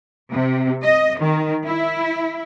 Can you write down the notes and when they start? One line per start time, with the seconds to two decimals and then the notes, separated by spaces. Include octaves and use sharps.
0.31 C3
0.84 D#5
1.20 D#3
1.65 E4